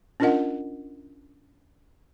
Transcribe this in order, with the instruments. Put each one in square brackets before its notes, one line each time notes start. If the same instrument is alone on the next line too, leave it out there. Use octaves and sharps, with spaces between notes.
[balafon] C#4 D4 F4 A#4 D#5 F#5